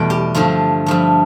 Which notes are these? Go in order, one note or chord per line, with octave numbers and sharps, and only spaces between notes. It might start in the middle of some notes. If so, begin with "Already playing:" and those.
Already playing: E2 B2 G3 A3 A4 B4 D5
G4
G2 D3 F3 A3 F4
G2 F3 A3